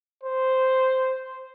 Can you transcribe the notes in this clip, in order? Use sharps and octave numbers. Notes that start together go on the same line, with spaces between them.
C5